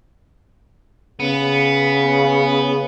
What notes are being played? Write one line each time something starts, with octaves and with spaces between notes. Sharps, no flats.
C#3 B3